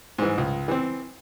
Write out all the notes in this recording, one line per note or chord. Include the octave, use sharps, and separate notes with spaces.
G#2 E3
C#2
E3 C4